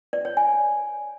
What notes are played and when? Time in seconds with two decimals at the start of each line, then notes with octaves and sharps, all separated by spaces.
0.13 D5
0.25 C#5
0.37 G#5